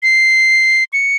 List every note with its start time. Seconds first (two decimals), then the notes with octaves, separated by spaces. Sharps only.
0.03 C7
0.93 C#7